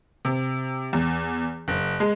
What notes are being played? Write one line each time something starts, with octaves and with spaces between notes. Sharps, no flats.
C3
E2
F#1
G#3